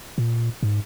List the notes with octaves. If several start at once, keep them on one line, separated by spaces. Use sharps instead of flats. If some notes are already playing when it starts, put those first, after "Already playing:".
A#2
G#2